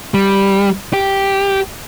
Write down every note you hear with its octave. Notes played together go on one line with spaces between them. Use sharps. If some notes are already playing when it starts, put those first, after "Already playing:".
G3
G4